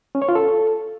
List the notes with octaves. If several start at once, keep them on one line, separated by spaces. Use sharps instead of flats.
C#4
C#5
F4
A4